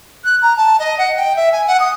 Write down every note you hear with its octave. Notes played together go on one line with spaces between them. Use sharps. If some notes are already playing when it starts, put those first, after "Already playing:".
F#6
A#5
A5
D#5
F#5
G5
E5
G#5
F#5
D#6